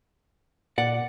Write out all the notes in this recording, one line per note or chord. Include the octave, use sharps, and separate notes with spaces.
A#2 D5 F#5